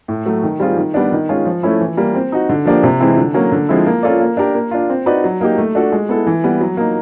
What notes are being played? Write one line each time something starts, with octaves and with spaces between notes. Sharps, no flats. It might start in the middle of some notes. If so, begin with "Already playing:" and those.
A2
F#3 A3
D#3
G3 C4 F4 G#4
D#3
G3 B3 D4
D#3
G#3 C#4 F4
F3
A3 C#4 E4
E3
G3 A#3
C4
D#4 F#4
D3
F3 A#3 D4 G4
C3
E3 G#3 C4 E4
D3
F#3 A#3 C#4
D3
F3 G#3 C4 E4
A#3
C#4 F4 A4 D5
A#3
D4 G4 A#4
A#3
D4 F4
C4
D#4 F#4 B4 D5
F#3
A#3 D#4 G4
A3
D4 F#4 A4 D5
G#3
B3 E4 A4
E3
G3 B3
F#3
A#3 D#4